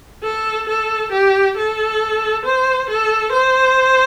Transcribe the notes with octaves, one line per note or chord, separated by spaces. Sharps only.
A4
A4
G4
A4
C5
A4
C5